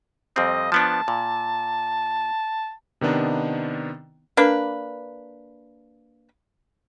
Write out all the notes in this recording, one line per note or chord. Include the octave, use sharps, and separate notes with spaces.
F2 G3 C4 D#5
F3 B3 D4 A5
A#2
C3 D#3 B3 D4 D#4
A#3 D4 B4